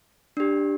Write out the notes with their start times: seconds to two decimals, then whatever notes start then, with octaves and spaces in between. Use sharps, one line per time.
0.37 D4 G4